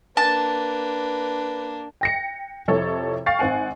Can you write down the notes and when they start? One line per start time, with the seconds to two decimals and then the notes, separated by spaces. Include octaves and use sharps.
0.17 A#3 D4 B4 A5
2.01 G5 A#6 C#7
2.68 F2 C3 E4 A4 C#5
3.26 F5 G5 C#6 A6 C7
3.39 G#1 C4 F#5 G#5